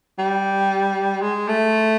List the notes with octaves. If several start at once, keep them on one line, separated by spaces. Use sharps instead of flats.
G3
G#3
A3